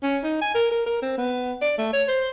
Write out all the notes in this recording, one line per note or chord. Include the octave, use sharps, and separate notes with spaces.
C#4
D#4
G#5
A#4
A#4
A#4
C4
B3
D5
A3
C#5
C5